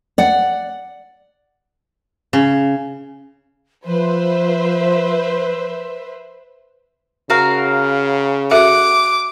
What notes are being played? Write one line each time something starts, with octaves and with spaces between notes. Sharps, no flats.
D5 F#5
C#3
F3 B4 C5 E5
C#3 F#4 A#4 F5
F#4 A4 E5 F#5 D6